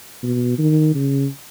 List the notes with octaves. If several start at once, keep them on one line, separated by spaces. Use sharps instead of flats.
B2
D#3
C#3